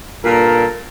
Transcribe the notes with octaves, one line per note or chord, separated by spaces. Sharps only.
G2 A#2 A4 A#4